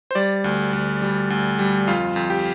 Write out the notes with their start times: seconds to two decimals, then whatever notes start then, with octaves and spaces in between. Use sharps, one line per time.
0.11 C5
0.15 G3 D5
0.44 D2
0.73 D2
1.02 G3
1.30 D2
1.59 G3
1.88 F2 F4
2.16 F2
2.30 G4